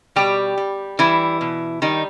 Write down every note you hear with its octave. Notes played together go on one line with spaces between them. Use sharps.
B2 G3 G4
G3
E3 G3 E4
B2
D#3 G3 D#4